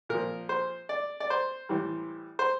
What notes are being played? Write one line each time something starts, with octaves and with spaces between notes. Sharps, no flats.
A#2 F3 A#4
C5
D5
D5
C5
A2 E3 G3
C5